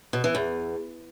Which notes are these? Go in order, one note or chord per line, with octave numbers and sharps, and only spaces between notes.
B2
E3
E2